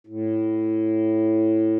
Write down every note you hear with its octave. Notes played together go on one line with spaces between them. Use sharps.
A2